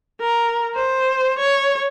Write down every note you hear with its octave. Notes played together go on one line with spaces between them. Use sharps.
A#4
C5
C#5